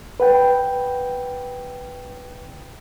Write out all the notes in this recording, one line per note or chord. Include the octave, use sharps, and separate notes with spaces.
B4 F#5 G5